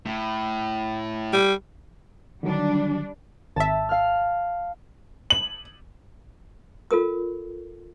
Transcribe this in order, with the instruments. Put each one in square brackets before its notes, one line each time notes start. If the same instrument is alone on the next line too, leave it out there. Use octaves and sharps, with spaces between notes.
[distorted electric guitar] A2
[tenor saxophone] G3
[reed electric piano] D3 D#3 F#3 [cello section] G3 D4
[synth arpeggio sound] G#1 E5 [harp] A5 E6
[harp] F5 F6
[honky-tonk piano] F#7
[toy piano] F4 A4 A#4 D#6